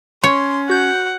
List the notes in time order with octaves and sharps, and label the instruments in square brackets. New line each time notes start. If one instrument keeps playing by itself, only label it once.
[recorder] C#4 [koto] C#5 [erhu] C6
[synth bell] F#4 G6 [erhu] F#5